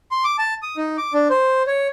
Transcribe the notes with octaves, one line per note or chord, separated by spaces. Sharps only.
C6
D6
A5
D#6
D#4
D6
D4
C5
C#5